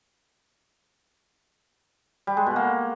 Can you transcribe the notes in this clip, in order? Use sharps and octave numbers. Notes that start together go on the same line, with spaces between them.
G3
G#3
B2
A#3